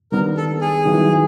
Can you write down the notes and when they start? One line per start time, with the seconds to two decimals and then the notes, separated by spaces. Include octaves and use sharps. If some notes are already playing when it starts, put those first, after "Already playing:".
0.12 D#3 G3 B3 D4 A#4
0.37 A4
0.61 G#4
0.86 D#3 F#3 B3 E4